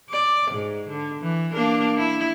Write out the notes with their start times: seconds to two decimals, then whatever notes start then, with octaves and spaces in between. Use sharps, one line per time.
0.10 D5
0.51 G#2
0.89 D3
1.22 E3
1.52 A#3 D4 A#4
1.97 E4